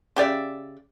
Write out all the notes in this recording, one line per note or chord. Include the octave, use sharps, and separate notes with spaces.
C#3 G4 D5 E5